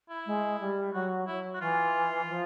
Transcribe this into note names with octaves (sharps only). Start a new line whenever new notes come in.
E4
G#3
G3
F#3 F#4
F#3 E4
F#4
E3 F4
F3